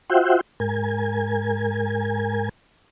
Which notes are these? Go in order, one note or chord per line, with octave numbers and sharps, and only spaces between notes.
F4 F#4 C5 E5 F#5 G5
G#2 A#4 G#5